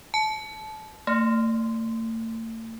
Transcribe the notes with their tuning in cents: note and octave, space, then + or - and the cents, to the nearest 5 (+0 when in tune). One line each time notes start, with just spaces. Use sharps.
A5 -25
A3 +45